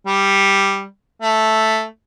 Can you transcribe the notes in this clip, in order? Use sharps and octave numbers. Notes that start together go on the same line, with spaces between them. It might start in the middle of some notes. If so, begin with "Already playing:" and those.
G3
A3